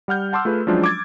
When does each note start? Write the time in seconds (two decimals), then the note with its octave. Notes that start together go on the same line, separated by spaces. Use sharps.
0.08 G3 F#5 F6 G6
0.33 F#5 A5 C6 D6 E6
0.45 A3 F4 G#4 B4
0.67 F3 F#3 G#3 C#4 D4 F4
0.84 D6 G#6 A6